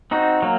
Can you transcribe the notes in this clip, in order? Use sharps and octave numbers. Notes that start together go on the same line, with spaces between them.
C4 D#4 F#4
F#3 A#3